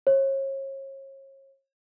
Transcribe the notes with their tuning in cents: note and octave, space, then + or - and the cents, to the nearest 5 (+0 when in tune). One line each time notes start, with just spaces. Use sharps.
C#5 -35